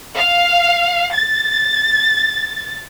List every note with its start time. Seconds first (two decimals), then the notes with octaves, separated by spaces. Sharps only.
0.15 F5
1.14 A6